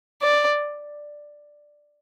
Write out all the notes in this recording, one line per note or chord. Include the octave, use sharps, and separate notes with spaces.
D5